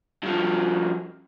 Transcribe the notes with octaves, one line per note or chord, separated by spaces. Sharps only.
G2 F3